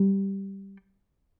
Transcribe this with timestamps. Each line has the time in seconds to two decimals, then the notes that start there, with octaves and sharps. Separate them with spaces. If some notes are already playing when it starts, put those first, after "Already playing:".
Already playing: G3